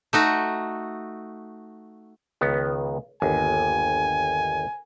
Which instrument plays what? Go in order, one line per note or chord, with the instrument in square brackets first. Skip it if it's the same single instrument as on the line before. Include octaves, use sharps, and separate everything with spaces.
[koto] A3 D#4 F#4
[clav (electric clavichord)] C#2 D#3 B3
[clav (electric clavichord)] G1 D#2 [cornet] G#5